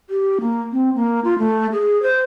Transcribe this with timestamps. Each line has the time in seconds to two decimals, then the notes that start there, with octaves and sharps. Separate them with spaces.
0.10 G4
0.41 A#3
0.72 C4
0.95 A#3
1.24 F4
1.39 A3
1.72 G#4
2.02 C5